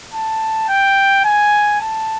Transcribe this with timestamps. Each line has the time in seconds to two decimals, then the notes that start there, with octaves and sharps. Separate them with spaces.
0.13 A5
0.68 G5
1.24 G#5
1.80 A5